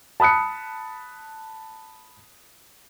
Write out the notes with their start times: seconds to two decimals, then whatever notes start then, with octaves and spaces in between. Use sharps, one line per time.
0.20 A5 B5 D#6 F#6 C#7